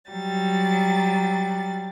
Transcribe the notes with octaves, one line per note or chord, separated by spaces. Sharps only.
F#3 G3 A6